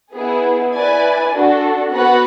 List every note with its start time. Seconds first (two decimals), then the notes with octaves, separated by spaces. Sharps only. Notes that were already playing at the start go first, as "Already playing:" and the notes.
0.14 B3 E4 G#4
0.73 E4 B4 D5 G#5
1.33 D4 F#4 A4
1.92 B3 F#4 B4 F#5